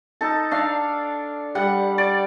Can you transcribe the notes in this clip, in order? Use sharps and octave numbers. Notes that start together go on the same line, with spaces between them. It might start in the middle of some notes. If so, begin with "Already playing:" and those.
D#4 A4
D4 F5
G3 F#5
D5